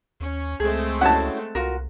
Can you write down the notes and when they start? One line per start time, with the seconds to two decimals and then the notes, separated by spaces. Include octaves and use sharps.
0.20 D#2 C#4
0.60 C#2 G#3 A3 C4 G#4
1.01 C#4 E4 F#4 F#5 A5
1.55 C2 F4 F#4 A#4